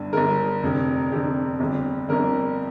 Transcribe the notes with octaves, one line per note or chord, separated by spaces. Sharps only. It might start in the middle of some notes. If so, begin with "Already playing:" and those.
Already playing: G1 G2 D3
G1 G2 D3 A#4
F1 F2 D3
F1 F2 D3 G4
G1 F2 D3
G1 F2 D3 A#4